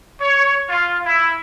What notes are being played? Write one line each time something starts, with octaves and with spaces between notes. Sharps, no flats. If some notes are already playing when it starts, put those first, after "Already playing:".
C#5
F4
E4